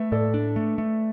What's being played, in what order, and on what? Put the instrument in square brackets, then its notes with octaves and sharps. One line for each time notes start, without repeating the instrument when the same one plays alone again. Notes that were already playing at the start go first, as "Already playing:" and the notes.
Already playing: [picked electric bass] A3 [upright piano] B4 E5
[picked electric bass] A2 [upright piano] A4 D5
[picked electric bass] D4
A3
A3